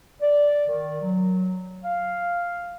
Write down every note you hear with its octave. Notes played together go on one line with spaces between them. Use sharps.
D5
D#3
F#3
F5